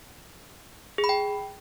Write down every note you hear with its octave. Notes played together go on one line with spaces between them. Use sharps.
G#4
B5
G5